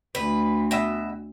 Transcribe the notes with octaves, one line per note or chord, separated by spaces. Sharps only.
D2 B4
B2 E5